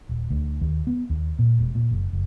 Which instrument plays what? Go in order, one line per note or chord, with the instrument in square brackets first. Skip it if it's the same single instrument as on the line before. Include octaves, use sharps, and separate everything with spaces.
[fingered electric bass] D#1
D2
D#2
B3
D#2
A#2
E1
A#2
F#1
F#1